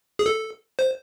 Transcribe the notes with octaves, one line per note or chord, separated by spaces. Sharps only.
G#4
A4
C5